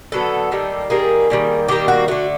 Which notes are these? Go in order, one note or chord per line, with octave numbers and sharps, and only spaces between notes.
D3 F#3 B3 A4
D#3 G3 A#3
D#3 G3 A#3 G#4
D#3 G3 A#3
D#3 G3 A#3 G4
F#4
D3 F#3 A3 F#4